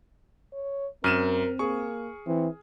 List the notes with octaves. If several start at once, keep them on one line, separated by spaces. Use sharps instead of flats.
C#5
F#2 C4 A#4 F6 D#7 E7
A#3 G#4 C#6
E3 C4